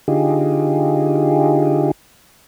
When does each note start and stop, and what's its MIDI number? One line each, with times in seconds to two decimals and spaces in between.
0.08 1.91 50
0.08 1.91 63
0.08 1.91 65
0.08 1.91 67
0.08 1.91 68